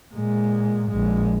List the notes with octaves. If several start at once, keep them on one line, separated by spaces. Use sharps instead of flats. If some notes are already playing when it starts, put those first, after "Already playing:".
A#2 G#3
A#1 G#3